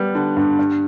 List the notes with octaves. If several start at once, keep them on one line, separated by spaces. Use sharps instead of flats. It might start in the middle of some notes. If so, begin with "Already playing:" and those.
Already playing: G3 B3
D3
G2
G2